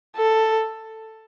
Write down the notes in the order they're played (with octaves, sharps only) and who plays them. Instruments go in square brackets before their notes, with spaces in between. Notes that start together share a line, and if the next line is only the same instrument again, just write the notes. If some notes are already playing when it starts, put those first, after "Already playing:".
[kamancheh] A4